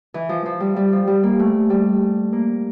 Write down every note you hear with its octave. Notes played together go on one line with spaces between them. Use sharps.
E3
F3
F3
G3
G3
F3
G3
A#3
A3
G3
A#3